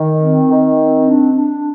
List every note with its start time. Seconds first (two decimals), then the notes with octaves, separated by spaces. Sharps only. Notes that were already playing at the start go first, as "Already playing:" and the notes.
Already playing: D#3
0.22 C4
0.50 D#3
0.78 C4
1.07 D4
1.34 D4